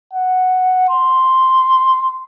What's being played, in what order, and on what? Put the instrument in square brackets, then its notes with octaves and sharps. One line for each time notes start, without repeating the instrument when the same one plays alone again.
[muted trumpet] F#5
C6